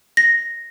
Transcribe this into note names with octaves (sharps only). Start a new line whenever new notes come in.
A#6